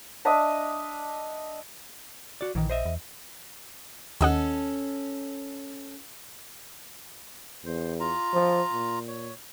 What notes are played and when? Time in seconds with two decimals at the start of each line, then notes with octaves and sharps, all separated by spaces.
0.25 D4 D#5 E5 A5
2.41 F#4 D5
2.55 A#1 D#3 E3
2.70 C5 D#5 E5
2.86 E2
4.21 D#2 C#4 A4 D#5 F#5
7.66 E2 C5
8.00 F4 A#5
8.34 F3
8.73 A#2
9.08 C#5